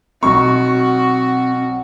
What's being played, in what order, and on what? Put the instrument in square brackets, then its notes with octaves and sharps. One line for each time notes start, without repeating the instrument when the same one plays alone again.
[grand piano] B1 C#6 [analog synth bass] C4 [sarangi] F#4